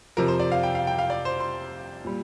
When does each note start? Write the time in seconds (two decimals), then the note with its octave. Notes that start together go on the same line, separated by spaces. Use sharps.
0.17 F2 C3 F3 A#4
0.28 C5
0.40 D5
0.52 F5
0.63 G5
0.75 F5
0.87 G5
0.99 F5
1.10 D5
1.25 C5
1.40 C6
2.05 A#2 G3